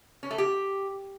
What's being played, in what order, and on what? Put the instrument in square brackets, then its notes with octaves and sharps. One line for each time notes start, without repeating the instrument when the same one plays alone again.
[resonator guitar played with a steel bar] C#4
A3
G4